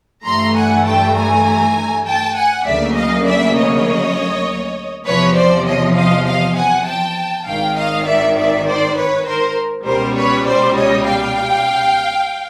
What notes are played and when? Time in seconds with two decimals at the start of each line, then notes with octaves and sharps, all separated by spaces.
0.24 G2 E3 A3 A#5 C6
0.55 F#5 G#5
0.85 G5 A5
1.15 G#5 A#5
2.06 G5 A5
2.35 F#5 G#5
2.65 D2 C#3 F#3 A#3 D5 E5
2.95 D#5 F5
3.26 D5 E5
3.55 C#5 D#5
5.05 E2 C3 F3 B4 C#5
5.35 C5 D5
5.65 C#5 D#5
5.96 D#5 F5
6.26 D#5 F5
6.55 F#5 G#5
6.86 G5 A5
7.46 G#1 G#2 D#3 F5 G5
7.76 D#5 F5
8.05 D5 E5
8.36 D5 E5
8.65 C5 D5
8.96 B4 C#5
9.26 A#4 C5
9.85 C#2 B2 G3 A#4 C5
10.15 B4 C#5
10.46 C5 D5
10.75 C#5 D#5
11.06 F5 G5